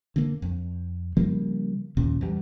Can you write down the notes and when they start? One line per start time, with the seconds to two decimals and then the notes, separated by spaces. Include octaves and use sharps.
0.16 D3 A#3
0.42 F2
1.17 C#3 F3 G3 A#3
1.97 D#2 A#2 C#3
2.21 E2 G3